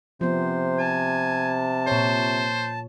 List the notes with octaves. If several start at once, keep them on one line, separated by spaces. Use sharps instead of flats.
C3 F3 B3 C5
G#5 A5
A#2 C5 C#5